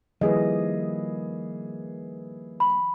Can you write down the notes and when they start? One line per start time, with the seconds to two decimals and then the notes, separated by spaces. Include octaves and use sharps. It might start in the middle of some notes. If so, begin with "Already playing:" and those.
0.21 D#3 F3 G3 A#3 E4 G#4 B4 D#5
2.60 B5